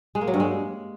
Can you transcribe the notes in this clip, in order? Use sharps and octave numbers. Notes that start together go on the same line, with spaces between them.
G#3
A#3
F#3
G2
G#3